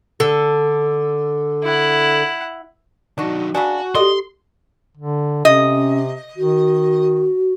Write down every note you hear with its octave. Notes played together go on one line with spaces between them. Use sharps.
D3 A4
E4 F#5
D#3 F#3 D4 F#4
C#3 F#3 D4 F#4 G#5
G4 A4 D5 D#5 C6
D3
C3 C#4 D#5
D#3 F#4